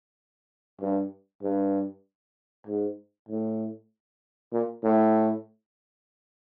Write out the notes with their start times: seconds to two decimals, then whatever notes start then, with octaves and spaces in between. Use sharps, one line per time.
0.81 G2
1.42 G2
2.67 G#2
3.29 A2
4.53 A#2
4.83 A2